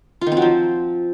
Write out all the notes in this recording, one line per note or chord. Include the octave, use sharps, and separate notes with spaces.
F4
D#3
C4
F#3
F3